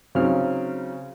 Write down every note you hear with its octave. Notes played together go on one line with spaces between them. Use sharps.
C#3 F#3 C4 D#4 F6